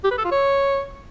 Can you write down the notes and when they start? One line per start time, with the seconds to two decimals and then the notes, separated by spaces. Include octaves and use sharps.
0.04 G4
0.11 B4
0.18 A4
0.25 F4
0.32 C#5